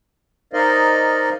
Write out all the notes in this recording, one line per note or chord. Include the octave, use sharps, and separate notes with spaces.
D#4 A#4 C5 D5 D#5 F5